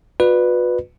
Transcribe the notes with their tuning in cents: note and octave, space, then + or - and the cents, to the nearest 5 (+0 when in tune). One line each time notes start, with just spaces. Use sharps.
F#4 -45 B4 +0 D5 +30